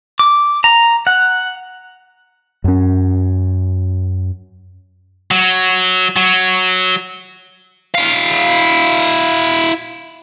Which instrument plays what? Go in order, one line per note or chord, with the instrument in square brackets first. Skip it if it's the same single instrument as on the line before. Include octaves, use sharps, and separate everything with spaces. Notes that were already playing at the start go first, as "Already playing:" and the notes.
[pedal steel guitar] D6
A#5
F#5
[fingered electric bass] F#2 C#4
[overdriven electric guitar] F#3
F#3
[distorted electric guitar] E4 F5